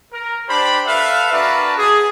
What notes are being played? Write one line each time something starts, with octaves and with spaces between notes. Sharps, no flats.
A#4
D4 G4 C5 D5 B5
A4 B4 E5 F5
D4 F#4 A#4 B4 D5 A5
G#4